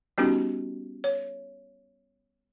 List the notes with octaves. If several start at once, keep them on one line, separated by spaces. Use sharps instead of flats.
G3 B3 C#4 D#4 F#4 G4
C#5